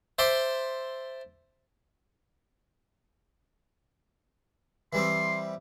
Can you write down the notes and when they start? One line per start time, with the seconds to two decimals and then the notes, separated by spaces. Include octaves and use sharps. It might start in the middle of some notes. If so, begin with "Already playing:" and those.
0.19 C5 E5 A5 C6 D6
4.93 E3 G3 C4 C6